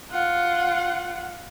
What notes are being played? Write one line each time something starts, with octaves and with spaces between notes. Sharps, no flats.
F4 F#5